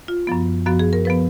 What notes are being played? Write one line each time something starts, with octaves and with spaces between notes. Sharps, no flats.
F4
F#2 F3 B3
F#2 F3 B3 F#4
G#4
A#4
F3 B3 B4